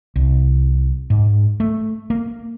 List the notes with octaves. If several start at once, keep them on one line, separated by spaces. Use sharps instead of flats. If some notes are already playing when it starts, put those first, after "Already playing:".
C2
G#2
A3
A#3